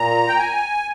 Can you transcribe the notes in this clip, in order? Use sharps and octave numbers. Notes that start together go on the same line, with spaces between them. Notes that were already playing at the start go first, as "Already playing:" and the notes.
Already playing: A#2 A#5
G5
G#5